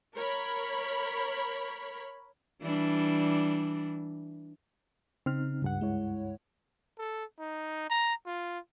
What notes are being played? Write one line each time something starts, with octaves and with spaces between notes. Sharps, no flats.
A#4 C#5 B5
E3 G3 D4
C#3 C4 D#4 F6
C#2 G2 F#5
G#3 E4 C#5
A4
D#4
A#5
F4